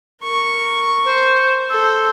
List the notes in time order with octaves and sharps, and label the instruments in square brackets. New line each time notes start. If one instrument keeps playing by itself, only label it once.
[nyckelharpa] A#4 C#6
[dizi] C5
[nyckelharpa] A4 C5 [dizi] E6